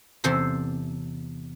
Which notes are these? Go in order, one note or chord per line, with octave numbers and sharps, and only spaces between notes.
E2 C3 A4 C5